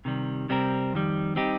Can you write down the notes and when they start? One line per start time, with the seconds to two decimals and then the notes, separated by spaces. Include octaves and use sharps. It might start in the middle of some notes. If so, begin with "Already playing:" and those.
0.05 C3 D#3 G3
0.49 C3 G3 C4 G4 A#4
0.93 F2 D#3 G3
1.36 G3 C4 D#4 G4